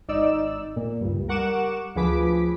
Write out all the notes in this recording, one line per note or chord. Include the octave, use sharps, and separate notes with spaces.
G#1 D#4 D5 E6
A#2
C#2 G2
G3 A#4 F#5 C#6 D6 E7
D2 F3 G#4 B4 D6 B6